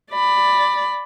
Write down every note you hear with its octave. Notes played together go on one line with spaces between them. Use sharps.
D5 B5